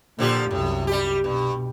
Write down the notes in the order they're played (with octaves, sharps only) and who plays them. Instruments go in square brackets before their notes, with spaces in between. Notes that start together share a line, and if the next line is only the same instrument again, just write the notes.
[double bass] A#2 [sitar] D3 F3 G4
[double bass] C2 F#2 [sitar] A2
[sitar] G3 G4
[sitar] G2 [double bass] B2